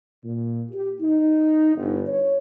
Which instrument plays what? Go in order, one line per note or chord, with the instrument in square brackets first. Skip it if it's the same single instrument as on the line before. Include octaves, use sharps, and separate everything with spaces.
[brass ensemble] A#2
G4
D#4
G1
C#5